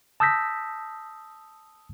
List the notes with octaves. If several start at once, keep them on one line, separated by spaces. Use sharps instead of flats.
A5 D#6 E6 G6 A#6 B6